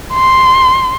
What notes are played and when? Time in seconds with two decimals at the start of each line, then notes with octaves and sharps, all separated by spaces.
0.14 C6